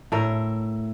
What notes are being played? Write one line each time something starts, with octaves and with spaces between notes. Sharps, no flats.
A2 A4 A#4